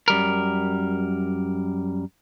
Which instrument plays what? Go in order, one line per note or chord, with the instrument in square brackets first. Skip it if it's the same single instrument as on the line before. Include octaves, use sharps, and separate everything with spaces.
[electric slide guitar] F#2 G3 A#4